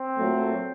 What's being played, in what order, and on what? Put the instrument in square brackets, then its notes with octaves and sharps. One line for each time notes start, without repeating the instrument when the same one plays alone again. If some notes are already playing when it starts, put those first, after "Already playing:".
Already playing: [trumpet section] C4
[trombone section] A#2 F#3 A3